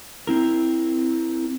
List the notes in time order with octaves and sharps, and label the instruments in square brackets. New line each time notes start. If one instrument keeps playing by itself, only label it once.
[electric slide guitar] C4 E4 A#4